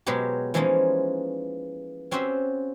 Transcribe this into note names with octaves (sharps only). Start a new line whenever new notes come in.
B2 F#3 G#3 B3 F#4 G4
E3 F3 G#3 A#3 C#4 D#4
C4 C#4 F#4 G4 C5 E5